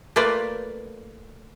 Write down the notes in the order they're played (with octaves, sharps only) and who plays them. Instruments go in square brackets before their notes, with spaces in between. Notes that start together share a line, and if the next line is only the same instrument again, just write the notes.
[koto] A3 A#3 F4 B4 D5